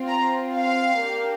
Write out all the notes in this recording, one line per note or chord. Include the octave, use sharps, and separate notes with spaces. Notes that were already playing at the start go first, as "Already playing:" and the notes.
Already playing: C4 F4
A#5
F5
A#3 D4 G4